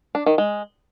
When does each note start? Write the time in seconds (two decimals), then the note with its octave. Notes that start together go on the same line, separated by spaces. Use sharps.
0.15 D4
0.26 D#3
0.38 G#3